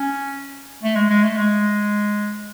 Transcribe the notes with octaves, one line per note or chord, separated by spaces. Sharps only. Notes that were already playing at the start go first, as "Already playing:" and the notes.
Already playing: C#4
A3
G#3
G#3
A3
G#3